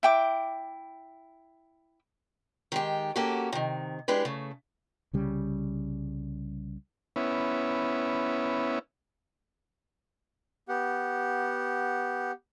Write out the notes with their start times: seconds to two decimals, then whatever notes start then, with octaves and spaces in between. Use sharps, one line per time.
0.03 E4 G5 D6
2.72 D#3 G#3 G4
3.16 A#3 C#4 F#4 G4 A4
3.53 C3 D#3
4.08 E3 G#3 D4 G4 B4
4.25 C#3 A3
5.13 C2 C#3 G3
7.16 B3 C#4 E4
10.69 B3 G4 F#5